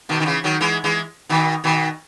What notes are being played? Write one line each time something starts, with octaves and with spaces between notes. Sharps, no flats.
B2 D#3
D#3
C#3 E3
D#3 F#3
E3 G#3
E3 G#3
B2 D#3
B2 D#3